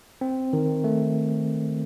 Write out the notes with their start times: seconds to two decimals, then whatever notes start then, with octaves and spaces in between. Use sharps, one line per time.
0.21 C4
0.53 D#3
0.84 A3